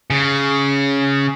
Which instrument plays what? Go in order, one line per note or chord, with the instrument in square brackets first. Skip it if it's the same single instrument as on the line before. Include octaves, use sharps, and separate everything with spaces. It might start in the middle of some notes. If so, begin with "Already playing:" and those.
[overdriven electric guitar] C#3